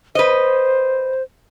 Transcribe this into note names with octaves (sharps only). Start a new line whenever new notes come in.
B4 C5 D#5